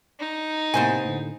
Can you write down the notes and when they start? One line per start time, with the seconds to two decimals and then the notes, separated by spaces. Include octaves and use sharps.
0.20 D#4
0.74 A2 C3 A#3 B3 C5 G#5
1.05 A2 D3